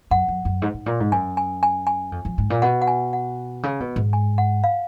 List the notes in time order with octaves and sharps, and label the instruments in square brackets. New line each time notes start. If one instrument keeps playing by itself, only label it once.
[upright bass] F#2 [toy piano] F#5
[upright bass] F#2
F#2
G#2
G#2
A#2
G#2
[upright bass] F#2 [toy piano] G#5
[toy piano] G#5
G#5
G#5
[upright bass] F2
F2
G#2
A#2
[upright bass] B2 [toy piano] F#5
[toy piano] F#5
G#5
F#5
[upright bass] C#3
B2
G#2
[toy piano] G#5
F#5
F5